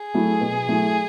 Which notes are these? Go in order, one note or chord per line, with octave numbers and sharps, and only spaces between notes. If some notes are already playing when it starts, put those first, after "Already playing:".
Already playing: G#4
F#3 A3 E4
B2
F#3 A3 E4